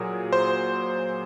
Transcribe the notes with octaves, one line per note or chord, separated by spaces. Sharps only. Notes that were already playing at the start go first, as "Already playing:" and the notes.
Already playing: A#2 F#3 G#4 A#4
C5